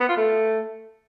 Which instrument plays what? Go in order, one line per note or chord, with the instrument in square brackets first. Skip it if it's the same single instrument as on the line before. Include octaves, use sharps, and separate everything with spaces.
[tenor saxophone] B3
F4
A3